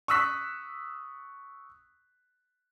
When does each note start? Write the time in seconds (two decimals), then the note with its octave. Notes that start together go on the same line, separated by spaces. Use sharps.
0.08 C#6 D#6 E6 F#6 B6